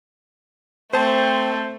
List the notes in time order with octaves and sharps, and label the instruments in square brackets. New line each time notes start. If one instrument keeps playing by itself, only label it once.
[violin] A3 [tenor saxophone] C4 [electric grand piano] C5 A5 [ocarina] G5